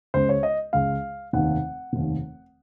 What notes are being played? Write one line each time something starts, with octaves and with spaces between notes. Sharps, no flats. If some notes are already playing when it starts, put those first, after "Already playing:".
C#2 C#3 G#3 C5
C#5
D#5
C#2 C#3 G#3 F5
F1 D#2 D#3 F#5
F1 D#2 D#3